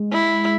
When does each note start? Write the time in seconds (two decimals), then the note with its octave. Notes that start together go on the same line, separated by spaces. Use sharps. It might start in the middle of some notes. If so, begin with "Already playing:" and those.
Already playing: G#3
0.12 E4